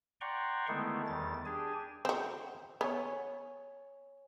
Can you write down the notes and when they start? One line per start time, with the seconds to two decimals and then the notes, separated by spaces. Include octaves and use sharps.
0.21 D5 F#5 G5 A#5 C6 C#6
0.68 D3 D#3 G#3 A3 B3 E4
1.07 E2 D#3 G3 A6
1.46 D4 G4 G#4 G#5
2.05 C4 F#4 C5 G5
2.81 B3 C#5 G#5